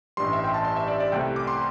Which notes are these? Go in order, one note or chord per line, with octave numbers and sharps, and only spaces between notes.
A1 G2 G3 C6
E5
G5
A5
C6
E5
D5
D5
C2 C3 A3 G5
D6
C6